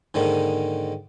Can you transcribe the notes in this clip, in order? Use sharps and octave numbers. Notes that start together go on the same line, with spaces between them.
G#2 D3 D#3 A#3